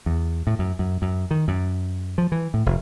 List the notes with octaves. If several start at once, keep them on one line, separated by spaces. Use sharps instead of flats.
E2
A2
F#2
F#2
F#2
D#3
F#2
F3
E3
A2
F1